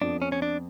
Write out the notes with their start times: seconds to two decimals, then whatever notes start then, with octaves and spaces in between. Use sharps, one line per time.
0.01 F2 F3 B3 D4 F4
0.22 C#4
0.32 C#4
0.42 D4